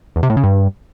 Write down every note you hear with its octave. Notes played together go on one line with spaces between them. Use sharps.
E2
C3
A2
C#3
G2